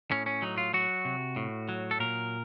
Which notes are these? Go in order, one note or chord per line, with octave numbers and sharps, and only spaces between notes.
A2 C#4
C#4
F#3 D#4
F4
F#3 F#4
C3
A2
F#3
A4
A#2 A#4